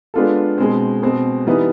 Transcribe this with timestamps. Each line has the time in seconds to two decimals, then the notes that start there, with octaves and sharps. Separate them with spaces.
0.14 G#3 B3 D4 F4 A4
0.58 B2 G#3 C4
1.03 B2 G#3 C4
1.46 E3 G3 B3 D#4